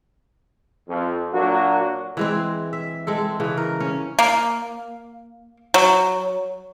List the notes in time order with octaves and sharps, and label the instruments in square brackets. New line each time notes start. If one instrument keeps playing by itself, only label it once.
[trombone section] F2
A#2 F#3 A#3 D4 F#4
[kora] E3 G#3 C4
E5
G#3 C4 A4
C#3 E3
A#4
C#4
[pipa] A#3
F#3